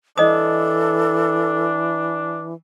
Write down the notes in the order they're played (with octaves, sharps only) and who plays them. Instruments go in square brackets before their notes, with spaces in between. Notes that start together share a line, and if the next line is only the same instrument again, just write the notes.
[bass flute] E3 [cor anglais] D4 [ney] A4 [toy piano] D#5 D#6